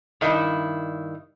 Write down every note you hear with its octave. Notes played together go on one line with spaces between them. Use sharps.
G2 D#3 E4